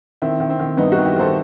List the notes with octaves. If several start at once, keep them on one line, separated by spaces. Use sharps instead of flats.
D#3 C4 E4
D#3
C4
D#3
G2 B3 D#4
D#4 F#4
D#3
E4 G4
D#3 A4 C5